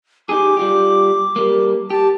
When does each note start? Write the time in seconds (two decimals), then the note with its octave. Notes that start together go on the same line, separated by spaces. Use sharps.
0.29 D#4 G4 G#4 D6
0.57 G3 F4 G4
1.36 G3 A#3
1.90 G4 A5